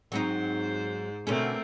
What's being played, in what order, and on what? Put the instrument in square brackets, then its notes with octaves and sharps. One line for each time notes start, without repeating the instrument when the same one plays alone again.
[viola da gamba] G#2 C5 [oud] F#3 C4 D#4
[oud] B2 D3 C#4 [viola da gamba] A3 C4 A#4